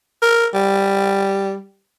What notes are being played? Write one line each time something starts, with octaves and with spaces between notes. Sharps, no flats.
A#4
G3